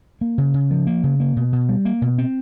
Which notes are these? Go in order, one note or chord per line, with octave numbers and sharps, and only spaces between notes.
A#3
C#3
C#3
F3
A#3
C#3
A#3
B2
B2
G3
A#3
B2
C4